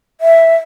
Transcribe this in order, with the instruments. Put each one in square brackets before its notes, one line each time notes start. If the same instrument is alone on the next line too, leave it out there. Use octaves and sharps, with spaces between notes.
[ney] E5